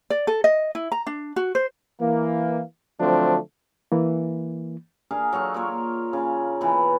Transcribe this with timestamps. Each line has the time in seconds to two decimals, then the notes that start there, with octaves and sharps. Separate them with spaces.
0.10 D5
0.27 A4
0.44 D#5
0.75 E4
0.92 A#5
1.07 D4
1.36 F#4
1.55 C5
2.01 E3 A#3
3.00 D3 F3 F#3 A3 C4 D4
3.92 E3 A#3
5.11 D4 G#4 A#4 F5
5.32 F#3 A4 F5 C#6
5.54 A#3 F4 A#4 C#5
6.13 C#3
6.61 B2 E3